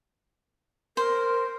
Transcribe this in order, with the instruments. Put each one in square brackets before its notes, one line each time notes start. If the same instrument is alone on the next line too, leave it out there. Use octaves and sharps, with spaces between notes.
[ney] A#4 [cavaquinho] C5